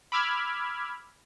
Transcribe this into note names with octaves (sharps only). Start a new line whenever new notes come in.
B5 D6 E6 F6 G#6